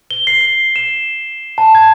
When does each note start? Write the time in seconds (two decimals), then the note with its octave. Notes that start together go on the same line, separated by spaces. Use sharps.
0.11 G7
0.27 C7
0.41 C7
0.76 E7
1.58 A5
1.75 G#6